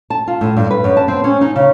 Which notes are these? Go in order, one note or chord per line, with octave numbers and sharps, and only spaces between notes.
A5
F4
A2
G2
B4
F#2
A5
C4
C#4
D#4
C#3